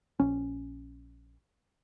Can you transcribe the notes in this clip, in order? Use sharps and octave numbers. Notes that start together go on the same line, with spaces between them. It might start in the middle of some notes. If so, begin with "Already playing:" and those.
A#1 C#4